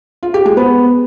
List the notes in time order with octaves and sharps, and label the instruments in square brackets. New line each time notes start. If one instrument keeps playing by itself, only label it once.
[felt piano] F4
G4
G#3
B3